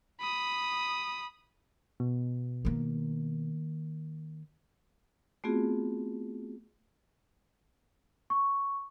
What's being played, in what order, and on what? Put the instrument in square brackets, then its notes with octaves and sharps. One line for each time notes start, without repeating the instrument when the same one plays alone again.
[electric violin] B5 D#6
[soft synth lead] B2
[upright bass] D#3 A#3
[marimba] A3 B3 C4 F4 F#4 G#4
[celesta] C#6